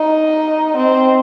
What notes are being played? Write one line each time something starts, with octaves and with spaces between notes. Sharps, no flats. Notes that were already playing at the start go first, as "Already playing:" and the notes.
Already playing: D#4
C4